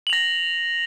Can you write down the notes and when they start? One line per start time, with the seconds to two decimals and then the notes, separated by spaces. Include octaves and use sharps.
0.07 F#7
0.10 F7
0.13 A#6